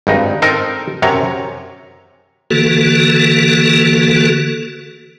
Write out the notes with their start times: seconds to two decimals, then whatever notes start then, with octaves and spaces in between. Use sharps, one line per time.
0.07 G#1 G2 D#4
0.42 C4 D#4 A4 A#4
1.02 F#2 C3 C#5 A#5
2.51 D3 E3 A#3 F#4 A4